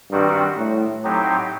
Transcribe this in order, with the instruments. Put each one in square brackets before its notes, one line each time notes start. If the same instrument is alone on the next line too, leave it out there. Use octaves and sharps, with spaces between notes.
[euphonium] G2 [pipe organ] D#3 G3 C4 F#4
[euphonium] A2
[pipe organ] A2 F#3 C4 D#4 G4